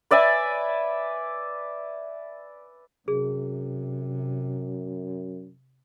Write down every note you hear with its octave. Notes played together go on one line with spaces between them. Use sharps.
B4 D5 E5 G#5
F#2 C3 G#4